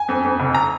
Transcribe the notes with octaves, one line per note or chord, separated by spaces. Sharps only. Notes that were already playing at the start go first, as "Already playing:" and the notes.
Already playing: G#5
F2
F2
F1
A#5